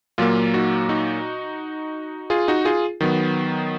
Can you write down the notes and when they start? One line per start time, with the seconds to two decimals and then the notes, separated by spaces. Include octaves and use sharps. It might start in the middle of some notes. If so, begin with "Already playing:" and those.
0.18 A#2 F#3 A#3 F4
0.54 D#4 F#4
0.89 D#4 F#4
2.30 F4 G#4
2.48 D#4 F#4
2.65 F4 G#4
3.01 D#3 F#3 B3